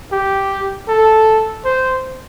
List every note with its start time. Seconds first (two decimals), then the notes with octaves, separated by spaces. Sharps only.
0.12 G4
0.88 A4
1.65 C5